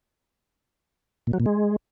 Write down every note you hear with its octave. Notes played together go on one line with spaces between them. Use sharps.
A#2
F#3
A#2
G#3